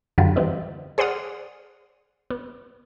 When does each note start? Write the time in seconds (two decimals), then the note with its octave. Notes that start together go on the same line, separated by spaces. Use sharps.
0.18 F#2 D3 F#3 G3 F4
0.36 E3 G3 B3 C4 D#4
0.98 G#4 C5 D5 F#5 D#6 F6
2.30 B3